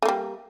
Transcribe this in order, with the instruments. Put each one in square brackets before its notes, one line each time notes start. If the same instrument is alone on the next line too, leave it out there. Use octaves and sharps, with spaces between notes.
[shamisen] A3
A#3
G3